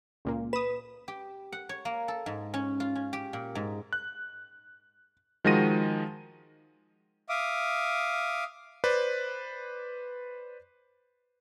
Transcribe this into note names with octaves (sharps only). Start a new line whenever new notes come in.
C#2 A#2 A#3
B4 D#6 E7
G4
F#5
C#5
A#3
A4
G#2
C#4
F4
C#4
G4
A#2
G#2
F#6
D#3 F3 G#3 F#4 A#6 D#7
E5 F5 D6 D#6
B4 C5 D5